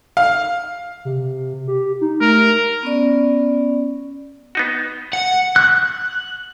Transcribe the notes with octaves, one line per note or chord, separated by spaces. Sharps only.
F5
C3
G4
D#4
A3 A#4
B3 C#4 D5
B3 D#4 F#4
F#5
F#6